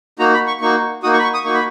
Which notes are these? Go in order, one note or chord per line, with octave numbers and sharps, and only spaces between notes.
A#3 D#4 F#4 A#5
B5
C#6
A#3 D#4 F#4 C#6
A#3 D#4 F#4 D#6
C#6
B5
C#6
D#6
A#3 D#4 F#4 C#6
B5